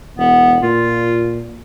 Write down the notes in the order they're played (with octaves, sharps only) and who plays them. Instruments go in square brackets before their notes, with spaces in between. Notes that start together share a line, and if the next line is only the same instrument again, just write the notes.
[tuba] E1 [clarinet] B3
[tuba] A#2 [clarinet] F4